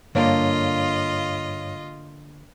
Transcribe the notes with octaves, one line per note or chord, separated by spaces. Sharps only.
G2 D3 A#3 D4 F4 C#5 D#5 F5